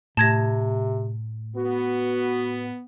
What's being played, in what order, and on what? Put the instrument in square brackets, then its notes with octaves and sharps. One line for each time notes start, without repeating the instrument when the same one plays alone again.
[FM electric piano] A2 [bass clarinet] C3 [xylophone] A5 G#6 A#6
[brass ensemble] B3 [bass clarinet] F#4